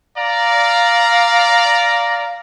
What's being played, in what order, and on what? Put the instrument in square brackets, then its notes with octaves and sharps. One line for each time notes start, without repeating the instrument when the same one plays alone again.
[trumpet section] D5 A#5 [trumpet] F5